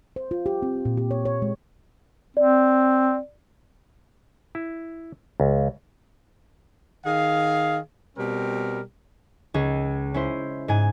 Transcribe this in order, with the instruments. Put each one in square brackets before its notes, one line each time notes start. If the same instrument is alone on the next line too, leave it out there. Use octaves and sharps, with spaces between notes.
[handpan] C5
F4
G4
C4
A#2
G4
C#5
C#5
G#3
[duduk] C4 [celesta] D5
[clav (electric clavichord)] E4
C#2
[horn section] D#3 G#4 F5
B2 G3 C4 A#4
[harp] C#2 C#4 G#4
C#4 E4 C5
G#2 G#4 G#5